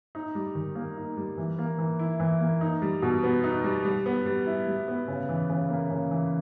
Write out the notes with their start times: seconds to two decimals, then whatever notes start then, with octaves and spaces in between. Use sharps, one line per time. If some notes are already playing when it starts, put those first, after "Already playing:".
0.15 D#4
0.35 G3
0.55 D#3
0.75 A#3
0.97 D#4
1.17 G3
1.37 E3
1.59 A#3
1.78 E3
1.99 E4
2.20 E3
2.40 A#3
2.61 D#4
2.82 G3
3.02 B2
3.23 B3
3.44 D#4
3.64 G3
3.85 G3
4.06 B3
4.26 G3
4.46 E4
4.67 G3
4.88 B3
5.08 C#3
5.29 E3
5.49 C#3
5.69 A#3
5.90 C#3
6.11 E3